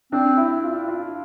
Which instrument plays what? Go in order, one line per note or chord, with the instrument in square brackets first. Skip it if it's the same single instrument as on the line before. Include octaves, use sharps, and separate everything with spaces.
[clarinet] C4 [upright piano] D4
[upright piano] E4
F4
F4